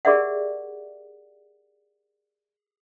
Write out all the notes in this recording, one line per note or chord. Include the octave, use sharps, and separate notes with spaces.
G4 G#4 A#4 D5 E5 F#5